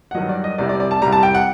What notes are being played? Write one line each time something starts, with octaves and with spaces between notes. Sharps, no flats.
F#5
G2 D#3 F#3 D#5
D5
D#5
C2 C3 G3 D5
D5
D5
A5
C2 C3 G3 A#5
A5
G5
F#5